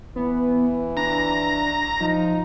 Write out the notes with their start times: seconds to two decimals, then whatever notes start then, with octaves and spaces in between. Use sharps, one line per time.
0.16 E3 B3
0.97 D4 A#5
2.01 F3 D#4